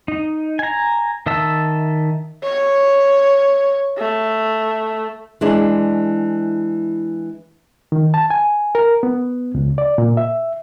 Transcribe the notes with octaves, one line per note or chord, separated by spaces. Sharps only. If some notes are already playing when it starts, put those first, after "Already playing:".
D#4
G#5 A#5
D#3 D#5 E5 A5 E6
C#5
A3
E3 G#3 D4
D#3
A5
G#5
A#4
B3
C#2
D5
A#2
E5